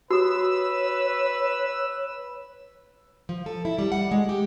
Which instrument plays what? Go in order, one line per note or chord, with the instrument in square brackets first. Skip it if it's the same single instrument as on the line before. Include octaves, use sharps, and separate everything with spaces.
[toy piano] F#4 D#6 [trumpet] B4 [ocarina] C#5 [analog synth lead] E6
[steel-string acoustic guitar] F3
A4
E4
G3
F#5
G#3
G4